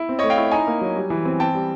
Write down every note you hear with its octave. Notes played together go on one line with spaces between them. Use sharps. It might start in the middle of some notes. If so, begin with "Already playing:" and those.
Already playing: E4
C4
A3 C#5 D#5
F5 G5
E4
D#4 G#5 A#5
A#3
F#3
G3
E3
C4
C4 G5 A5
G3